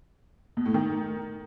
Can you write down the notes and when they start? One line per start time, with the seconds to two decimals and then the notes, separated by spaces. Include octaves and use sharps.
0.57 B2
0.66 A2
0.74 D#3